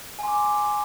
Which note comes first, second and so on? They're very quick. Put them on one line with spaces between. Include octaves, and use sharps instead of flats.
G#5 C6 D6